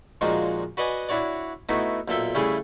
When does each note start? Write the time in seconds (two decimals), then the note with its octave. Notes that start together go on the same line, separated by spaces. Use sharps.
0.21 A#2 F3 G#3 D4 D#4 F#4
0.77 F#4 B4 D5 D#5 F#5 G#5
1.09 D4 E4 F#4 C#5 D5
1.69 A3 B3 D#4 E4 F#4
2.08 B1 A#2 A4 E5 G5
2.35 C#3 G3 A3 E4 G#4 A4